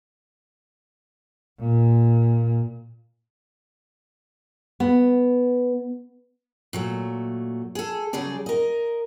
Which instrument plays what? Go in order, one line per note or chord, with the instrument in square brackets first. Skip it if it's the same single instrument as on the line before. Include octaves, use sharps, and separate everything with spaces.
[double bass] A#2
[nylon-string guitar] B3
[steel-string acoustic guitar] A#2 F#3 A3
G#4 A4
C#3 F#3 G3 G#4 D5
A#4 D#5